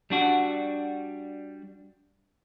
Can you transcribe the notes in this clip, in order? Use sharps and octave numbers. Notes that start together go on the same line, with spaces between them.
G3 D4 F#4